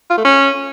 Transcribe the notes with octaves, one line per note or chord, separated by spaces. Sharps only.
F4
A3
C#4